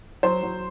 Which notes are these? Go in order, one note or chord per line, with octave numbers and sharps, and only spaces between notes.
F#3 C5
F#3